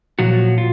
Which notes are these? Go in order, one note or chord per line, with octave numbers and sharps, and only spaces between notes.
A#2 F3 F#3 F#4
F4